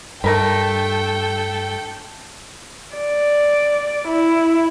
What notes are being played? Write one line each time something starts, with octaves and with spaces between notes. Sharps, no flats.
G2 A3 A4 A#4 G5 B5
D5
E4